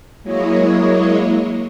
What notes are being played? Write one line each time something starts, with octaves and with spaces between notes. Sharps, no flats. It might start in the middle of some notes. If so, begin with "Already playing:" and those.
F#3 G#3 A#3 E4 C#5 D#5